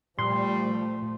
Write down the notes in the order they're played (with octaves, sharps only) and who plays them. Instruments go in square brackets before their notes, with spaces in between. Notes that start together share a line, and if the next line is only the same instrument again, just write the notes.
[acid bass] A#2 [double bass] F3 A3 [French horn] G3 [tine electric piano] C6